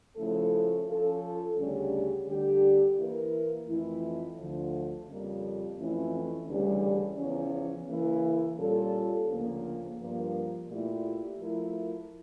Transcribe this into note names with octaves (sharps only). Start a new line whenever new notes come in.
C#3 F3 A3 E4 A4
F3 C#4 F4 A4
D2 C#3 G3 C#4 G4
D2 D3 G3 D4 G4
E3 A#3 E4 A#4
F2 E3 A3 E4
D2 D3 F3
F2 C#3 G3 A#3
F2 E3 A3 C#4 E4
D2 C#3 E3 G3 C#4
E2 C#3 F3 C#4
C#3 E3 A#3 E4
A#2 G3 C#4 F4 A4
D2 C#3 F3 A#3 C#4
G2 F3 A#3
A#2 A3 E4 G4
F3 A3 E4 A#4